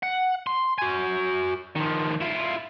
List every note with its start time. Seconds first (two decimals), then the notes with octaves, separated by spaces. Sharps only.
0.03 F#5
0.47 C6
0.78 F#4 G#5
1.76 D#3 F3
2.21 E4 F4